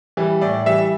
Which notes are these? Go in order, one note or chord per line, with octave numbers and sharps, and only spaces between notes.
E3 G3
A2 D5
E3 G3 E5